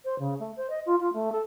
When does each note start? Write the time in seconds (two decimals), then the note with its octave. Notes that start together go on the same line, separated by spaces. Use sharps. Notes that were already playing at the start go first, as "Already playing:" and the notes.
0.04 C5
0.19 C#3
0.39 A3
0.56 C5
0.69 D#5
0.86 F4
1.00 F4
1.13 A3
1.32 A4